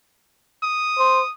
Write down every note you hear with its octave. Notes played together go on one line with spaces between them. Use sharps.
D#6
C5